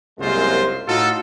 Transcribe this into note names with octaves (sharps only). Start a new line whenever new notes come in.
C2 F#2 G#3 A#3 F4 C5
A2 D#4 F4 F#4 A4